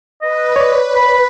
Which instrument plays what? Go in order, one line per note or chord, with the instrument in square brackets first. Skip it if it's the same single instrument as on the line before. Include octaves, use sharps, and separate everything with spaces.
[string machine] B4 [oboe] D#5
[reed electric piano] C#5 D5
[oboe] B5